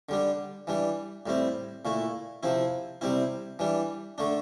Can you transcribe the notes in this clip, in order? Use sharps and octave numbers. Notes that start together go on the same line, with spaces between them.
D3 G3 D4
E3 G3 D4
A2 G3 C4 E4
A#2 A3 E4
C3 F3 C4 E4
C3 G3 C4 E4
E3 G3 D4
D3 A3 D4